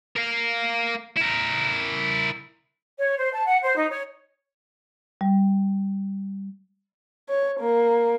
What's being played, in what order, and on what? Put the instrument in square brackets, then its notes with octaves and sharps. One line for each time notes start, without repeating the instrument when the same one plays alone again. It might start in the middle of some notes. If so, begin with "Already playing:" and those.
[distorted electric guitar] A#4 F5
E4 A#4
[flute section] C#5
C5
A5
F#5
C5
D#4
C#5
[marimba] G3
[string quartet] C#5
A#3